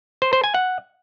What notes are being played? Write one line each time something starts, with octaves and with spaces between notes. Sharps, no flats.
C5
C5
G#5
F#5